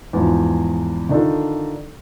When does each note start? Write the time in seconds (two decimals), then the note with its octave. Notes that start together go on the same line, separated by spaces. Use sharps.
0.13 E2 G#2 F3
1.09 D3 D#3 D4 D#4 F4 A4